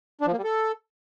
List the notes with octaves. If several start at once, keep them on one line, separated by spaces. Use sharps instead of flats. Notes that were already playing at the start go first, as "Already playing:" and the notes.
D4
F3
A#3
G3
A4